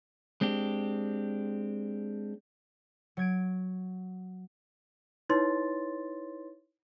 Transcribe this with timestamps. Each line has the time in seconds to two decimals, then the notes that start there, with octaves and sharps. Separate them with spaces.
0.41 G#3 C4 D4 G4
3.17 F#3 G#6 D7
5.30 D#4 E4 B4 C#5 C6 A6